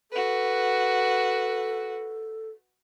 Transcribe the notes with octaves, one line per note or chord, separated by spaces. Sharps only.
F#4 A4 B4